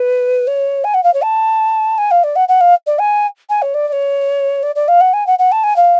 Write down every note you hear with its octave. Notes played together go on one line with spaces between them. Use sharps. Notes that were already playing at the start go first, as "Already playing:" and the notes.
Already playing: B4
C#5
G#5
F#5
F5
C#5
A5
G#5
F5
D5
F#5
F#5
F5
D5
G#5
G#5
C#5
D5
D5
C#5
D5
D5
F5
F#5
G#5
F#5
F#5
A5
G#5
F5